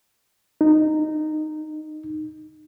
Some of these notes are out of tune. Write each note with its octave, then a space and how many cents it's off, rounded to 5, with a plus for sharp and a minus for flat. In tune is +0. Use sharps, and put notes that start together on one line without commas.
D#4 -15